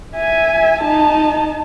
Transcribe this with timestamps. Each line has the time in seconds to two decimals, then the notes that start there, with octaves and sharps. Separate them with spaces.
0.17 E5 G#5
0.82 D#4 A5